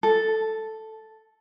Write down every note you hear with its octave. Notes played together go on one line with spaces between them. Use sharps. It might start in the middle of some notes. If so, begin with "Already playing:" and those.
A4